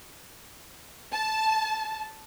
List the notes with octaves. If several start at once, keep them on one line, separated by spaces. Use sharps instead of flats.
A5